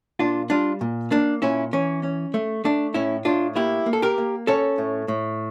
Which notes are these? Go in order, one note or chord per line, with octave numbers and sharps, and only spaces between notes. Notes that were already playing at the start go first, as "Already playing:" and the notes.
A#2 D4 F4
G3 D4 F4
A#2
A#3 D4
A#2 C#4 E4
E3 C#4
C#4
A3
A3 D4
A2 C#4 E4
A2 D4 F4
A#3 E4 G4
A#3
A4
G4 A#4
A#3
C#4 A4 C#5
A2
A2